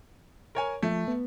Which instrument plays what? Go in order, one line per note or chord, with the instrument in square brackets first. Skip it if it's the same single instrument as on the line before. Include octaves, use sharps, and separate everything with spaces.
[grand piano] A#4 C#5 G#5
[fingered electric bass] F3 [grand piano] A3
[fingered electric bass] B3